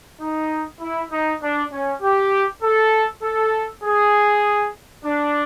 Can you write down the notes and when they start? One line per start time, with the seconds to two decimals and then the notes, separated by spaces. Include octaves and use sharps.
0.21 D#4
0.81 E4
1.12 D#4
1.42 D4
1.73 C#4
2.03 G4
2.63 A4
3.23 A4
3.84 G#4
5.05 D4